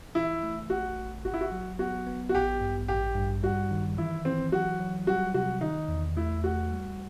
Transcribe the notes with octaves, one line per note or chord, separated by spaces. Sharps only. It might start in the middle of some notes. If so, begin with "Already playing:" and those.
E3 E4
A3
A1 F#4
A1
G1 F#4
E4
F#4
F#3
B3 F#4
B3
F#4
A1 G4
G2
A1 G4
G2
G3 F#4
D#3
E3 E4
E3 C4
F#3 F#4
F#3
G3 F#4
C3 F#4
D#3 D#4
E2
A3 E4
A3 F#4
G3